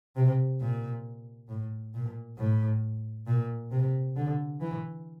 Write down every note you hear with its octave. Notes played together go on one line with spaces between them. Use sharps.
C3
A#2
A2
A#2
A2
A#2
C3
D3
E3